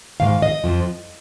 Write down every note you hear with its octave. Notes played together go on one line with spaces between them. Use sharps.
G#2 D#3 F5
D#5
F2 F3